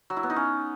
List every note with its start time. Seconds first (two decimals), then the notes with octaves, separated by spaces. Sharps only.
0.10 F#3
0.17 E4
0.23 B3
0.30 D#4
0.36 C#4